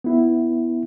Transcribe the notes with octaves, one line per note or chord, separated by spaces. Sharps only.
B3 E4